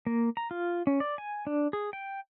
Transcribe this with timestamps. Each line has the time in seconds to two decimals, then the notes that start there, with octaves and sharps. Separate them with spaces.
0.07 A#3
0.37 A#5
0.51 F4
0.87 C#4
1.00 D5
1.18 G#5
1.47 D4
1.73 G#4
1.93 G5